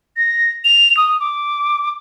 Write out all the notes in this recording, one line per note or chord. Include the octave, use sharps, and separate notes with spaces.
A#6
F7
D#6
D6